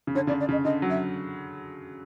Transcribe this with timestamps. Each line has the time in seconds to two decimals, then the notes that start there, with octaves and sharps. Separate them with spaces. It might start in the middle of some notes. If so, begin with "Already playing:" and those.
0.07 C#3
0.15 D3 C#5
0.27 C#3 D5
0.32 D3
0.40 D5
0.49 C#3 D#5
0.65 D3 D#5
0.82 F#3
0.90 E5